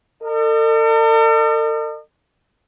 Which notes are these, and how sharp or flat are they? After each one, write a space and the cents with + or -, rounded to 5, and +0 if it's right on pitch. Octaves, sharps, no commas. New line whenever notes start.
A4 +45 D#5 -45